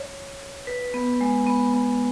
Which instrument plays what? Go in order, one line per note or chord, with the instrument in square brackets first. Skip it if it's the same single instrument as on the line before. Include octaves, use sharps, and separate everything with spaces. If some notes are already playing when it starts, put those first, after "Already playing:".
Already playing: [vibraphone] C#5
B4
B3
G#3
B3
B3